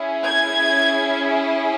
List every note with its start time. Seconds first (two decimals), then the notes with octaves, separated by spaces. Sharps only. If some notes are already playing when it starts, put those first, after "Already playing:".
Already playing: C#4 E4 G#4
0.24 G#6